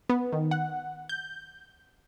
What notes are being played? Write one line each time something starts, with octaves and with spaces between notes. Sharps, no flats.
B3
D#3
F#5
G6